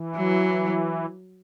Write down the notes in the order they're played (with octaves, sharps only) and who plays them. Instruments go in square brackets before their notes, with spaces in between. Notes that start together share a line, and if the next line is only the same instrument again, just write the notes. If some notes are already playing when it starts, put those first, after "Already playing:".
Already playing: [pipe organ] E3
[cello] F#3